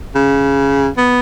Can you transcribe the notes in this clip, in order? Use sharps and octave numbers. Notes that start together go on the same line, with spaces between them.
C#3
B3